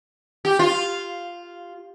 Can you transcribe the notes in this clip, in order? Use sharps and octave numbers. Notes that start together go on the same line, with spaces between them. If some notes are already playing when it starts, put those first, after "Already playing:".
G4
F4